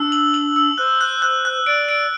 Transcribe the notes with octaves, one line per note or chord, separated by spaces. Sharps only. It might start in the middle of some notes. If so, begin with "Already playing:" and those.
Already playing: D4 E6
F#7
F#7
E6
C5 F#6
F#6
F#6
F#6
D5 D7
D7